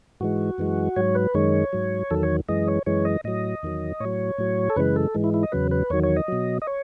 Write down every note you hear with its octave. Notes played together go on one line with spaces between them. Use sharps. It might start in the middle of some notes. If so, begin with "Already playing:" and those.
G#2 E3 G#3 F#4
F#2 E3 G#3
G#2 F#3 C#5
B4
F#2 D#3 G#3 C#5
G#2 F#3
E2 D#3 F#3 A4
C#5
F#2 E3 G#3 D#5
C#5
F#2 E3 G#3 C#5
D#5
A2 F#3 D#5
E2 D#3 F#3
A2 F#3 C#5
A2 F#3
A4
F#2 C#3 E3 G#3 B4
A4
G#2 E3 G#3
E4
E4
D#5
E2 C#3 F#3 B4
B4
E2 D#3 F#3 C#5
C#5
D#5
B2 F#3
D#5
C#5